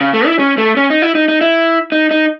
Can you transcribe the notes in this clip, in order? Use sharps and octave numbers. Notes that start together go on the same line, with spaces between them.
C#3
A3
E4
C#4
A3
C#4
D#4
E4
D#4
D#4
E4
D#4
D#4